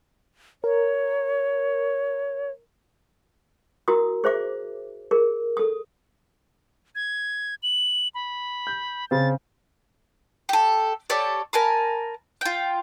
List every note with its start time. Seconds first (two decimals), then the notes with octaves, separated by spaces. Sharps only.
0.64 A#4 C#5
3.88 E4 F#4 A#4 D#6
4.24 G#4 C5 E5 D6
5.11 G#4 A#4
5.57 A4 D#6
6.95 G#6
7.63 F#7
8.15 B5
8.67 G6
9.11 C#3 C4 A6
10.49 G4 A4
11.10 G4 A4 C#5 D5
11.53 A#4 G#5 A5 B5
12.41 F4 G5